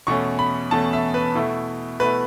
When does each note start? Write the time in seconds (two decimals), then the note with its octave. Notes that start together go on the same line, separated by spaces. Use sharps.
0.07 E2 B2 A3 C#4 C#6
0.39 B5
0.71 E2 B2 A3 C#4 A5
0.93 E5
1.14 B4
1.35 B2 A3 E4
2.00 B2 A3 E4 B4